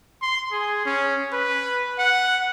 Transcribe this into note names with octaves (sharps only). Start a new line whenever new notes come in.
C6
G#4
C#4
B4
F#5